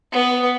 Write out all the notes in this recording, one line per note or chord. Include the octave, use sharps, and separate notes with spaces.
B3